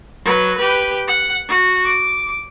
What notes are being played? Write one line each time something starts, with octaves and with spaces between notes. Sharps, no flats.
F#3 B4
G4 B4
F#5
F#4
D6